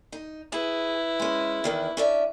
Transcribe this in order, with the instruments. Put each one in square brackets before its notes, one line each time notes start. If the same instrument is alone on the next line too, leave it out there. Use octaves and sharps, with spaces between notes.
[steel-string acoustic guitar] D#4
[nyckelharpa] E4 B4 [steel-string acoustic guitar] G#4
[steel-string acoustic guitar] G#3 C#4
E2 D#3 E3
C#4 D4 E5